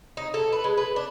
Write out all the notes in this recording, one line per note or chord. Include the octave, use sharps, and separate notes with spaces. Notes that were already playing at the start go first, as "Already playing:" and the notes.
D#4
A4
B4
G#3
B4
D4